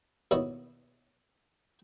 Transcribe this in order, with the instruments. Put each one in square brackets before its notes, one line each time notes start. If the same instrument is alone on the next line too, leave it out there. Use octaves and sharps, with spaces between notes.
[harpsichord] D#2 B2 E4 C#5 D#5